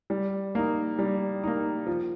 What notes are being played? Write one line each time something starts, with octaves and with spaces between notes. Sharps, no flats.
G3
A#3 D#4
G3
A#3 D#4
F3